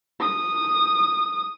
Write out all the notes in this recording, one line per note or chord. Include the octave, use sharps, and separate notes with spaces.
D#6